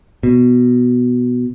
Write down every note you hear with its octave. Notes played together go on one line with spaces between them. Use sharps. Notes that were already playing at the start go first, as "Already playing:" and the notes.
B2